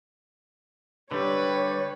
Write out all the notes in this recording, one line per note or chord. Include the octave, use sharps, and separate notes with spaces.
G2 D3 G3 B4 C#5